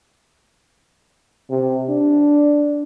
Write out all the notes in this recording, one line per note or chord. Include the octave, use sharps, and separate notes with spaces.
C3
D4